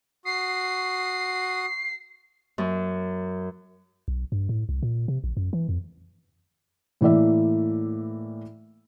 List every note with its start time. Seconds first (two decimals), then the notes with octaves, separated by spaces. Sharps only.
0.25 F#4 D#6 C7
2.58 F#2
4.08 B1
4.32 G2
4.49 A2
4.69 C2
4.83 A#2
5.08 C3
5.24 A#1
5.37 F#2
5.53 E3
5.69 F2
7.01 A2 E3 A#3 D5 E5